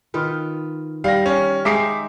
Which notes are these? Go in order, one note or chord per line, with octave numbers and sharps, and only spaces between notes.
D#3 F4 B4
G3 F5 A#6
C#4
G#3 D#4 E5 G5 D6 C7